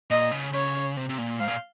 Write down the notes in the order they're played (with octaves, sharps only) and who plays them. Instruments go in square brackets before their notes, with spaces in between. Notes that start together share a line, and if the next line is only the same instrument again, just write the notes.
[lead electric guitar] A#2 [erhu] D#5
[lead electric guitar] C#3
[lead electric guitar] C#3 [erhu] C#5
[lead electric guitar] C3
C3
A#2
[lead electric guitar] G#2 [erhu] F5
[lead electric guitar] A#2